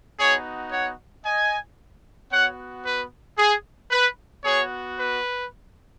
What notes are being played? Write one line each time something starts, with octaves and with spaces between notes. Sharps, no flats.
B3 D#4 F#4 G#4 C#5
C#5 F#5
D#5 G#5
B3 F#4 C#5 F#5
B4
G#4
B4
B3 F#4 G#4 C#5
B4